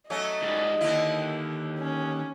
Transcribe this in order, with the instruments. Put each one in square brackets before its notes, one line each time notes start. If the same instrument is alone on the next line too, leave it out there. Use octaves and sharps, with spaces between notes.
[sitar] F#3 A3 C#4 [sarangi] D#5
[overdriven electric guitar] G#2 G3
[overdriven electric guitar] D#2 [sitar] D3 E4
[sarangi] C#4